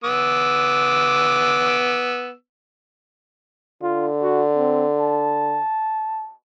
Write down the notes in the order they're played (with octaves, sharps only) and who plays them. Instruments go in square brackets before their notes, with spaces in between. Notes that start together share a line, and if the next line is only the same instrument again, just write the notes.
[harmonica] B3 D6 E6
[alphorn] D3 [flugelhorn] F4
[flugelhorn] F#4
C4
A5